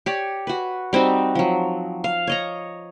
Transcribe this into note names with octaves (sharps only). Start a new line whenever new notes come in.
G4 C#5 D5
F#4 B4
G3 C4 D#4 F#4
F3 F#3
F5
C#5 D#5 A#5